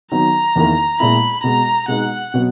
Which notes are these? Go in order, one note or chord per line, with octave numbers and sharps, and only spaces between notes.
D#3 F#3 B3 D#4 A#5
E2 D#3 A#3 E4 A#4
A#2 G#3 B3 E4 B5
B2 G#3 B3 A#5
B2 G#3 B3 D#4 F#5
B2 F#3 B3